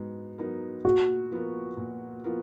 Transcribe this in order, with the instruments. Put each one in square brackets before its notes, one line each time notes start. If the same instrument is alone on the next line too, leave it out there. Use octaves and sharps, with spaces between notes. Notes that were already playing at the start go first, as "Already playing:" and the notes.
Already playing: [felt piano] G#2 F#3 B3 D#4
F#3 B3 D#4 A#4
[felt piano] A#2 [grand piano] F#4
[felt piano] F3 B3 F4 A#4
A#2
F3 B3 F4 A#4